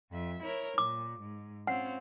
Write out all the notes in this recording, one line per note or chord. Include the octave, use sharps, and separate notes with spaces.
F2 E5
E4 A#4 C#5
A#2 D6
G#2
C4 C#4 F4 F#5